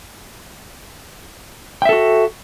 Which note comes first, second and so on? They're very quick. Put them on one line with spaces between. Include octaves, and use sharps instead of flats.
G5 E5 A4 F#4